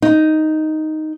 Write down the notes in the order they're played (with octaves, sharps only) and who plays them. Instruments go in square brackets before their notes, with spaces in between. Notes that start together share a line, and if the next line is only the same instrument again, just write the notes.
[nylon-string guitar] D#4